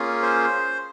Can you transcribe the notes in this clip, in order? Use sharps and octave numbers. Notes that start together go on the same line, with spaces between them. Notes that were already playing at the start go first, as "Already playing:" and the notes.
Already playing: A#3 C#4 F4 G#4
C5